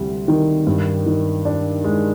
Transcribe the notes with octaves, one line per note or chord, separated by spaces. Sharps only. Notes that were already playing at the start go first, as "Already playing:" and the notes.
Already playing: D2 C3 G3
D#3
G2
D#3
D4
G#3